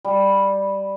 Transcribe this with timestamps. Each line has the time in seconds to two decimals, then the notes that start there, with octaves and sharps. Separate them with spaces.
0.05 G3